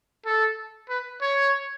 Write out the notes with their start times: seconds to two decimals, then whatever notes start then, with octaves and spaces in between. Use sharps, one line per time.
0.26 A4
0.89 B4
1.21 C#5